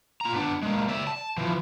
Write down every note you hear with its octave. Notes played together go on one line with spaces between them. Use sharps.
F4 A#5
B3 D4
G#3 A#3
D5 E5
A5
E3 F3